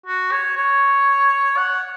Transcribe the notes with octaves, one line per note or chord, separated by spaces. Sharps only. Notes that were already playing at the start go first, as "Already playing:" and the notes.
F#4
C#5
C#5
F#5